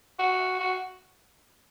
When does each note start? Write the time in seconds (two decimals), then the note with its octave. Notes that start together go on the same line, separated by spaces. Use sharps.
0.19 F#4
0.60 F#4